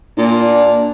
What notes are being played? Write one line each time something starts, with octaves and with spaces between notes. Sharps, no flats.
A#2 D4